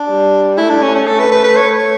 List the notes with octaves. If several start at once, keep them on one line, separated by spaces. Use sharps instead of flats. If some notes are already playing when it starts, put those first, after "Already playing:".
Already playing: D4
G3
A3 E4
D4
C#4
C#4
A4
B4
B4
B4
C#5
C#5